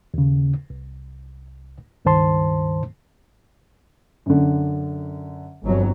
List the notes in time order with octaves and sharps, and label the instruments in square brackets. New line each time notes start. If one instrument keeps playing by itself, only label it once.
[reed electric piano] D#2 C#3
C2
C#2 G2 D#3 C5 A5 C6
[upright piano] F#2 D3
[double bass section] G1 F2 F#3